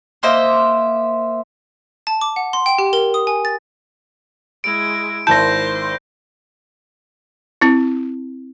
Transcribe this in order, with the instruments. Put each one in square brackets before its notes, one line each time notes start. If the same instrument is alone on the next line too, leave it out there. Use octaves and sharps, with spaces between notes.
[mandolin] A#3 C5 D#5 E5
[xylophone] A5
D6
F#5
C6
G5
G4
A#4
D#6
G#5
A6
[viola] G#3 E4 [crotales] D7
[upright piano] G#1 D#3 E4 [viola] C5 C6 [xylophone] A5 [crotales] G6 A#6
[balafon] C4 E4